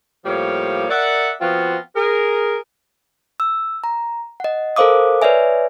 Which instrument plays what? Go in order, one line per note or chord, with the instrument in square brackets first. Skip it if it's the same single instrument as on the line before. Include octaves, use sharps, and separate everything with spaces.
[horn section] A2 F3 G3 A#3 C#5 F5
A#4 D5 E5 F#5
F3 B3 C4 F4 F#4
G#4 A#4
[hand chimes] E6
A#5
D#5 F#5
A4 A#4 C5 F5 D6 D#6
B4 C#5 D5 E5 G#5